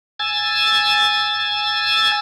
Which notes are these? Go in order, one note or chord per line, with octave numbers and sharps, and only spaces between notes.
G#5 E6 G#6 A6